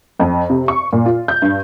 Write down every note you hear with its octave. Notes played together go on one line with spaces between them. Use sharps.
F2
C3
C#6
A#2
F4
G6
G2